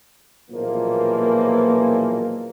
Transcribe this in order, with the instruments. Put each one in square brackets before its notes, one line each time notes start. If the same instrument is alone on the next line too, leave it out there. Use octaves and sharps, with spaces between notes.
[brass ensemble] B1 A#2 C#3 E3 F3 A#3